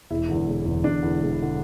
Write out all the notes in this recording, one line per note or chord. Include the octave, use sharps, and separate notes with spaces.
E1 E4
E2 D3
E1
E2 D3
E1 D4
E2 D3
E1
D3